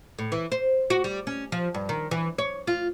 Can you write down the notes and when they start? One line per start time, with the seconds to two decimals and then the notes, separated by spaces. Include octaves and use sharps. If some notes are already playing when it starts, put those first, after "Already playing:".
0.19 A2
0.32 E3
0.52 C5
0.90 F#4
1.04 G3
1.27 C#4
1.52 F3
1.74 G2
1.89 D#3
2.11 E3
2.38 C#5
2.67 F4